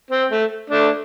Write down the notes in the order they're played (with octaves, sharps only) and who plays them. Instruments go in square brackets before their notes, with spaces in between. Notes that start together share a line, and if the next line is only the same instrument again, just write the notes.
[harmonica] C4
A3
A3 D4